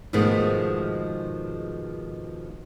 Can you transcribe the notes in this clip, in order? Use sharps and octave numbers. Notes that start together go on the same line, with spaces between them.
G#2 B2 D#3 F3 G#3 A3